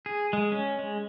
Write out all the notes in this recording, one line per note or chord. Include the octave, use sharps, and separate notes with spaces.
G#4
G#3
C#4
G#3